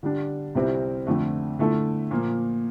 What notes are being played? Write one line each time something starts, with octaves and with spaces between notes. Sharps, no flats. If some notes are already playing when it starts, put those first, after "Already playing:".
D3 G3 D4
C2 C3 G3 C4 E4
F2 D3 A3
D3 A3 E4 A4
A#2 F3 A#3